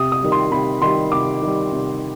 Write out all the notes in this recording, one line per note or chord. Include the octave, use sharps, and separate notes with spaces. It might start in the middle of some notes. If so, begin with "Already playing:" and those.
Already playing: C3 D#6
D#6
D#3 G3
C6
C3 B5
D#3 G3 C6
C3 D6
D#3 G3
C3